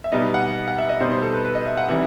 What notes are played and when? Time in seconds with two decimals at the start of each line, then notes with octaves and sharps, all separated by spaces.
0.04 E5
0.12 B2 G3 B3 D#4 D#5
0.34 F#5
0.68 F#5
0.78 E5
0.89 D#5
1.00 B2 G3 D#4 C5
1.11 C5
1.22 A4
1.34 B4
1.45 B4
1.55 D#5
1.66 E5
1.77 F#5
1.88 C3 E3 G3 D#4 E5